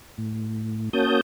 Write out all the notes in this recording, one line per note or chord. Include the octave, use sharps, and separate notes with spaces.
A2
A#3 C#4 F#4 A5 D#6 G6